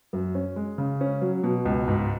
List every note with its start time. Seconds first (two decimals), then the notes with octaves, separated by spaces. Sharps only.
0.13 F#2
0.35 C#4
0.56 G#3
0.78 C#3
1.01 C#4
1.22 F#3
1.43 B2
1.65 C#2
1.88 G#2